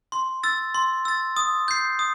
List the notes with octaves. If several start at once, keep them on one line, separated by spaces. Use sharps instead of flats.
C6
E6 A6
C6
E6 A6
D#6
G6 C7
D#6